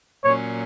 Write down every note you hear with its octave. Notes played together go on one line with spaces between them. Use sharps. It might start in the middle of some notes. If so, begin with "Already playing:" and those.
A#2 F#3 C#4 C#5